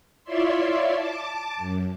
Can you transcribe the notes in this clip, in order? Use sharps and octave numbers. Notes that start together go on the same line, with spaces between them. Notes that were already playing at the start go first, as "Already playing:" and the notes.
E4 F4 C#5 D5 E5 C6
A5 D6
F#2